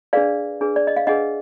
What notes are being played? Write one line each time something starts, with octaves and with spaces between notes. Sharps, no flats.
D4 G#4 B4 D5 F5
D4 G#4 B4
D5
D#5
F5
D4 G#4 B4 D#5 F#5